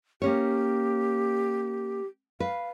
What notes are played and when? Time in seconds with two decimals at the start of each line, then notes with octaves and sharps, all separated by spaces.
0.22 A#3 C#4 G4 C#5
2.40 B4 F5